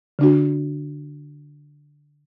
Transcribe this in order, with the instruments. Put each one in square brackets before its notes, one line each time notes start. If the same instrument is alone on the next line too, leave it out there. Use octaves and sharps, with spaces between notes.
[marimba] D3 D4 F#4